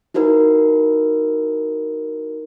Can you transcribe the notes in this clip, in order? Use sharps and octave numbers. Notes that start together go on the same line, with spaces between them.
D#4 E4 F#4 A#4 B4